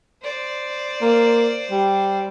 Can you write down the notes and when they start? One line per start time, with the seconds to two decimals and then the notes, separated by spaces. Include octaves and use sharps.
0.22 C5 D5
1.02 A#3
1.71 G3